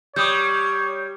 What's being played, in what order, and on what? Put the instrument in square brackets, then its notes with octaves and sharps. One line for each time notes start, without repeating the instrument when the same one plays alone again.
[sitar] G3 [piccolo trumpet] C#5 [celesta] D6 D#6 G6